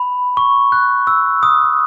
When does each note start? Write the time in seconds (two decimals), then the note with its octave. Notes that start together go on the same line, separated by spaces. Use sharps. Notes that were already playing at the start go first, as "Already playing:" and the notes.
Already playing: B5
0.37 C#6
0.72 F#6
1.07 E6
1.43 D#6